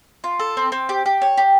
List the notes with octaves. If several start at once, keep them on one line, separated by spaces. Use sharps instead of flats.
F4
A4
C4
C4
G4
G4
C#5
G4